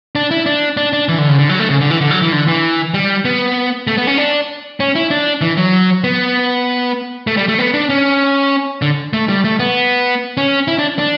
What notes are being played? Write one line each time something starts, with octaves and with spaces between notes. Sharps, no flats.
D4
E4
D4
D4
D4
E3
D3
C#3
D3
F#3
A3
C#3
D3
E3
D3
F#3
E3
D3
E3
G3
B3
A3
B3
C#4
D4
C#4
E4
D4
E3
F#3
B3
A3
G3
A3
B3
D4
C#4
D3
A3
G3
A3
B3
C#4
E4
D4
D4